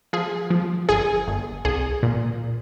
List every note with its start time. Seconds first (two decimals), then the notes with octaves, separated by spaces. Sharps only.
0.13 F3 G#4
0.50 F3
0.89 G1 G#4
1.28 G1
1.65 C2 G#4
2.03 A#2